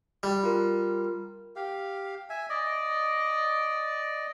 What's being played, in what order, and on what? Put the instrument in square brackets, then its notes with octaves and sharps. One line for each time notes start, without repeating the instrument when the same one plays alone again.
[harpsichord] G3
[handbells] F4 A#4
[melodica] G4 F5
E5 G#5
D5 D#5